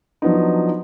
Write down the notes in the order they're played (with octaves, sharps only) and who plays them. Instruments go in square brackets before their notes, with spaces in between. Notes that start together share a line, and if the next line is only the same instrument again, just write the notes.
[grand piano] F3 F#3 B3 D4 D#4